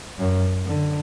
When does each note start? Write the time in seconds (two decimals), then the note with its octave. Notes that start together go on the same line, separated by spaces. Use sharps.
0.19 F#2
0.66 D3